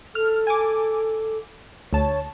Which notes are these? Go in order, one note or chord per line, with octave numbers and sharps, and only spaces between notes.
A4 F6
G#5 D6
D2 C#5 A5